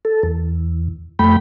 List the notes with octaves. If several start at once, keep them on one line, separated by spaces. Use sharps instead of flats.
A4
E2
F2 A3 G5 B5